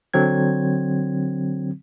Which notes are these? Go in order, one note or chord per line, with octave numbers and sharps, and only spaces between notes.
D3 F#3 C4 G#6